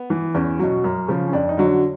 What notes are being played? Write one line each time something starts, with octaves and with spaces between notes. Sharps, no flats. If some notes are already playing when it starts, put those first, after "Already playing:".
Already playing: B3
E3
E2 C#4
B2 F#3
F#2
C#3 F3
C#4
F2 D4
D#4
D3 F#3
D4